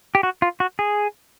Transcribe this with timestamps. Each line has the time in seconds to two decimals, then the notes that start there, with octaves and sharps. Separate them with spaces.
0.15 G4
0.23 F#4
0.42 F4
0.60 F#4
0.79 G#4